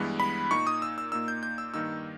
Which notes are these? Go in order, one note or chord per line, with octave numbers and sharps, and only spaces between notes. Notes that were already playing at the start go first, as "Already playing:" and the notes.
Already playing: G2 E3 G#3 B3
B5
A#2 A#3 D#4 C#6
D#6
E6
E6
A#2 A#3 D#4 E6
G6
G6
E6
G2 D#3 A#3 D#4 E6